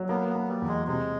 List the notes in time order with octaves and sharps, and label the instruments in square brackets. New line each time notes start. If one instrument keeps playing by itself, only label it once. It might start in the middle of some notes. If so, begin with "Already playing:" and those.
Already playing: [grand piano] F#3
[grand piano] A#3 [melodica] B3
[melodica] B3
[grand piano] A#3
[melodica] G3
[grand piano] E2
[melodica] G#3
[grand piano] C3 [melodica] G#3